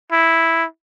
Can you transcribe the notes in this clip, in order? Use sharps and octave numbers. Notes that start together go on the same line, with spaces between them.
E4